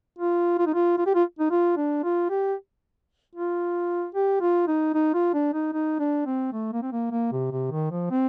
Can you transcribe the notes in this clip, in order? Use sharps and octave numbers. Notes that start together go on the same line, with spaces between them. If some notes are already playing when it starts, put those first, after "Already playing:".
F4
F4
D#4
F4
F4
G4
F4
D#4
F4
D4
F4
G4
F4
G4
F4
D#4
D#4
F4
D4
D#4
D#4
D4
C4
A3
A#3
C4
A#3
A#3
C3
C3
D#3
F3
C4